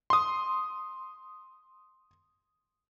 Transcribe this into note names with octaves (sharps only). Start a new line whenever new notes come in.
C6 D#6